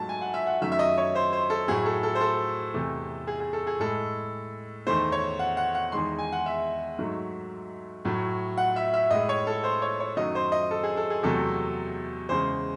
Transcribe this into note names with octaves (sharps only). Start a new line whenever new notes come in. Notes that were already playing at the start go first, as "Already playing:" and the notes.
Already playing: G#2 F#3 A3 A5
G#5
F#5
E5
F#5
F#2 D#3 F#3 A3 E5
E5
D#5
C#5
C5
C5
A4
A2 F#3 A3 G#4
A4
A4
C5
A4
E2 C3 E3 A3
G#4
G#4
A4
G#4
A2 G#3 A4
E2 D#3 A3 C5
C#5
F#5
F#5
F#5
E2 D#3 G#3 C6
G#5
F#5
E5
G#2 F#3 A3
A2 F#3 A3
F#5
E5
E5
A2 G#3 D#5
C#5
A4
C5
C#5
C#5
F#2 D#3 F#3 A3 D#5
C5
D#5
A4
G#4
A4
G#4
E2 C3 F#3 A3 A4
E2 C#3 G#3 C5